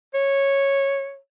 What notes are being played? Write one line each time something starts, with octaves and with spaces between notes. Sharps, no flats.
C#5